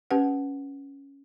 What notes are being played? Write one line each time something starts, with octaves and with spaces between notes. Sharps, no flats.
C#4 G4 B4 F#5